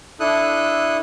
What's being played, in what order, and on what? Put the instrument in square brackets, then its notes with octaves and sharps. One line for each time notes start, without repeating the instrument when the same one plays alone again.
[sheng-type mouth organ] D4 E4 A4 D#6 F#6